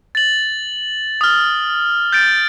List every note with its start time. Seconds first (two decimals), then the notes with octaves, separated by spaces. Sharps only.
0.15 A6 F#7
1.21 D#6 F6
2.12 G6 A6 D7